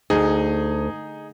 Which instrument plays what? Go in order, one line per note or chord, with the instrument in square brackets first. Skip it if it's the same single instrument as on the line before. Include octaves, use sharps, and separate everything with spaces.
[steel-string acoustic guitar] D2 [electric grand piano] D#4 G#4